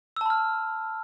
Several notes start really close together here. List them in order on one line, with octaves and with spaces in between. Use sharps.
E6 A5 B5 F6